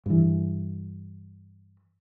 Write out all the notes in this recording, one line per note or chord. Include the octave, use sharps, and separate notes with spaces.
G2 E3